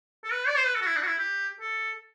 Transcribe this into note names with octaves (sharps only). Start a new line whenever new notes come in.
A4
B4
D5
C5
B4
A4
F#4
E4
D4
F#4
E4
G4
A4